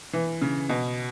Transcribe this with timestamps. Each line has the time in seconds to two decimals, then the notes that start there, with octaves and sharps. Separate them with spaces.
0.13 E3
0.42 C#3
0.69 B2